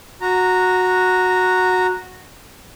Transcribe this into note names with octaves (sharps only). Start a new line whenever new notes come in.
F#4 A#5